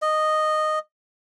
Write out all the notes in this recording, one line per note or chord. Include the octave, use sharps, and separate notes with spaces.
D#5